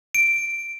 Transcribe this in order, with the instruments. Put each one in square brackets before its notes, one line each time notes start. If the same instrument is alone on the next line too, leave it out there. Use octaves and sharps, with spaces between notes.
[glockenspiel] D7